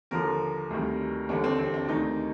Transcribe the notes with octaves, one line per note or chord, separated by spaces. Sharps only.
D#2 D3 F3 A#4
D2 C3 D#3 G3
D#2 D3 G3 D4
C4
C4
D4
D2 C3 D#3 D#4